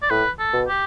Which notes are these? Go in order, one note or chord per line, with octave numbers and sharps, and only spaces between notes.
D5
A2 B4
A4
B2
G4